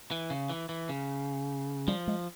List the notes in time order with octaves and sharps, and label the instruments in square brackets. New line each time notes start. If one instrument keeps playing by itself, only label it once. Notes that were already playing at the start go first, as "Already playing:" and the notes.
[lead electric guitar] E3
C#3
E3
E3
C#3
[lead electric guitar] F3 [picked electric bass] G3
[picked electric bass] G#3